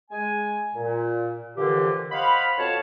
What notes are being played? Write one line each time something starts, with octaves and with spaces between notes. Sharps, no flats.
G#3 G#5
A#2
G2 A#2 D3 E3 F3 G4
C5 D#5 F5 F#5 B5
F2 B2 C#5 F5 A5